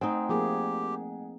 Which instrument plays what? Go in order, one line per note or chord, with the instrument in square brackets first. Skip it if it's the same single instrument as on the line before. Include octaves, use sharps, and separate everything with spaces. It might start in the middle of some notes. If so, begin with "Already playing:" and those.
[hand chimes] A3 F#5 G#5 [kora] C4 D#4
[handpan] F3 A#3 G#4 [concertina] G4